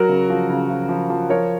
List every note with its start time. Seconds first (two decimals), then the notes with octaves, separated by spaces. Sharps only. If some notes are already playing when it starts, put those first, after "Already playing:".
Already playing: F#3 F#4 A#4
0.09 C#3
0.30 F3
0.50 C#3
0.69 F3
0.89 F3
1.10 F3
1.29 F3 A#4 C#5